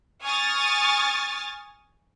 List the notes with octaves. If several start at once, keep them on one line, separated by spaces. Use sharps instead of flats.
G#5 C#6 D#6 F6 A6